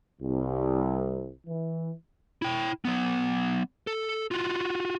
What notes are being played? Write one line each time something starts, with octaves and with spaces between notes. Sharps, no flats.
C2
E3
E4 G5
F#3 B3
A4
F4 F#4